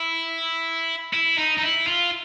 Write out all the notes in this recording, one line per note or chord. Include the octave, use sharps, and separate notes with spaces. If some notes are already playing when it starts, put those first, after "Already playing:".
Already playing: E4
E4
D#4
D#4
E4
F4